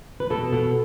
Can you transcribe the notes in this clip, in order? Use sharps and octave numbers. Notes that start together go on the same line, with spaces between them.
B4
B2 A4
B2